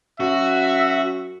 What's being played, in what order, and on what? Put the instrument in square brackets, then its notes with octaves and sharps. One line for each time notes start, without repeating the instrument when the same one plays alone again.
[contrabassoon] F#2 [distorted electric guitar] F#4 [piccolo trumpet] E5